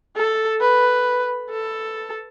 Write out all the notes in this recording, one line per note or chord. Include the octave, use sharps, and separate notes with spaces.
A4
B4
A4